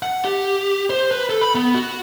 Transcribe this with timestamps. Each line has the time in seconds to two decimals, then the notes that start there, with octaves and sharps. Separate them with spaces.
0.03 F#5
0.25 G4
0.90 C5
1.11 B4
1.29 A4
1.41 B5
1.55 B3
1.74 F#4